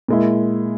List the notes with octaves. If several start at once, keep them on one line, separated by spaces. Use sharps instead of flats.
A#2 G#3 E4